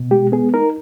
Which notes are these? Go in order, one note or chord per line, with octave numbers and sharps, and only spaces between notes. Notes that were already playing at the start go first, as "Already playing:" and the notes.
Already playing: B2
G#3 G4
B3 G#4
D#4 A#4